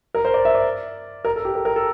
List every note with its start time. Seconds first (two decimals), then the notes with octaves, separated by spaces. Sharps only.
0.15 A#4
0.25 C5
0.34 D5
0.45 E5
0.55 D5
1.25 A#4
1.36 A4
1.45 G4
1.55 A#4
1.65 A#4
1.76 A4